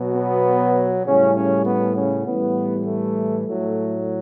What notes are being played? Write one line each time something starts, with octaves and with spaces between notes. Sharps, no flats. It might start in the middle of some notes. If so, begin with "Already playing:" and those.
Already playing: B2 F#3
B3
A2 C#3 G3 C#4
C#3 C#4
B3
C#3 C#4
A2 E3 G3 B3
A3
A2 F#3 A3